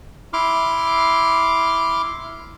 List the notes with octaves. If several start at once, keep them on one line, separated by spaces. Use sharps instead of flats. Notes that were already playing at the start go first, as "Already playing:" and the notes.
E4 C6 D6 F6